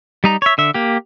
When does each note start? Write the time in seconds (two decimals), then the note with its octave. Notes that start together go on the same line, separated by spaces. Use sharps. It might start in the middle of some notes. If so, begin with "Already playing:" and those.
0.24 G3 D#4 A#5
0.42 C#5 E5
0.58 D3 E5
0.74 A#3 G4